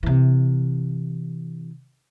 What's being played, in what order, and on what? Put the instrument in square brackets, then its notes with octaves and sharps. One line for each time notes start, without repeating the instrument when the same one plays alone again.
[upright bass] C3 E3